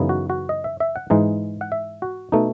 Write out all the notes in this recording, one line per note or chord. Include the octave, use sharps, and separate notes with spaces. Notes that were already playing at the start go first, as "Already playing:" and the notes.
Already playing: F#2 C#3 E3 B3 D#4
F#4
F#4
D#5
E5
E5
F#5
G#2 E3 G#3 D#4
F#5
E5
F#4
B2 A3 D#4